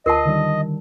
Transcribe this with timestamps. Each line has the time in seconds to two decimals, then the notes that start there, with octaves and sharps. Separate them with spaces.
0.06 D2 F4 A#4 D#5 A5 C7
0.25 D3 D#3 G3